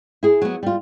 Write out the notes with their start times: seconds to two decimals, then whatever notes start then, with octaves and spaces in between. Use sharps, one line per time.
0.23 E4 G#4
0.42 F#3 B3
0.63 G3 F4